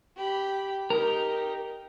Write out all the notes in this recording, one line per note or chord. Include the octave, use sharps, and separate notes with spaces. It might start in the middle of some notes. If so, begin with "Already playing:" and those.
G4 B5
D#4 G4 A#4